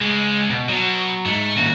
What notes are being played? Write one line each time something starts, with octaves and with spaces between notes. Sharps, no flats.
C#2 G#3
B2
B2 F#3
G#2 A3
D#3 A#3 C#4 F#4